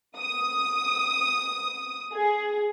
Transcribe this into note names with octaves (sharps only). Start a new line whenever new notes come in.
D#6
G#4